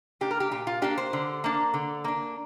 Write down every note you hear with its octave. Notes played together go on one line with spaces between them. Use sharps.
A#3 D4 G4
A#4
G4
A#2 G4
F4
A#3 D4 G4
C5
D3
A#3 D4
D3
A#3 D4